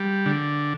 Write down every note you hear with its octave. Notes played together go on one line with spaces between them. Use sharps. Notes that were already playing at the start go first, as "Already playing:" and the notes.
Already playing: G3
D3